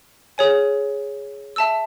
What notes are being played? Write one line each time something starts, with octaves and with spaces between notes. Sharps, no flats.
G#4 C#5 G#5
E5 A5 E6